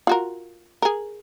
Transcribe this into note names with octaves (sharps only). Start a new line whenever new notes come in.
F4 F#4 A#4
G#4 A#4